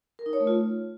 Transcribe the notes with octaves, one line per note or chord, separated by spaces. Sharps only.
A#4
D#4
C#5
A3
F4